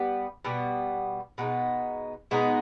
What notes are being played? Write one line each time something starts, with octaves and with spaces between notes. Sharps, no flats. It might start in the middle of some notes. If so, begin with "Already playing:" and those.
Already playing: G3 B3
B2 G3 B3
B2 G#3 B3 D#4
B2 G#3 B3 D#4